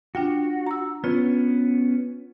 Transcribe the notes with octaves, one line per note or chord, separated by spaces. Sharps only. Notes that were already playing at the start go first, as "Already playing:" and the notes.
D4 F4 F#4 G5
A#5 E6
B3 C#4 F4